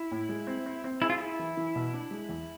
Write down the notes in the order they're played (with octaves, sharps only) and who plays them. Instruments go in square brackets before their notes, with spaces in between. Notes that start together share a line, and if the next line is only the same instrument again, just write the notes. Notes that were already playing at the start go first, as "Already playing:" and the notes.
Already playing: [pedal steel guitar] E4
[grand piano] A2
G#3
C4
C4
C4
[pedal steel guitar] E4 [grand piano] G#4
[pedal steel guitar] F4
[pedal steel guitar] E4 [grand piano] G#4
[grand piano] E3
E3
B2
D4
G#3
E2